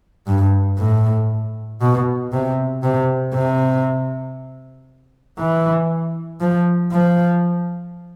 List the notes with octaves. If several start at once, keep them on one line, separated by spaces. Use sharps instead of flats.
G2
A2
B2
C3
C3
C3
E3
F3
F3